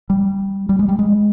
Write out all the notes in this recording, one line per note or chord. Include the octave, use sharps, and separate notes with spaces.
G3
G3
G#3
G3
G#3